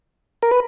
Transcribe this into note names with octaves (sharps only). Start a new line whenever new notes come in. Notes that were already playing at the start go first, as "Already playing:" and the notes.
A#4
B4